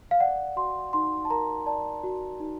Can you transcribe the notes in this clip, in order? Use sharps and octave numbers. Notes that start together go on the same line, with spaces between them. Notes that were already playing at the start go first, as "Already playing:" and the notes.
F5
D5 F#5
F#4 C6
D#4 C6
A5
A#4 A#5
D5 A5
F#4
D#4